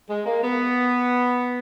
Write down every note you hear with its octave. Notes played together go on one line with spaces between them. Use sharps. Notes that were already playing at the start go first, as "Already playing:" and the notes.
G#3
A#3
B3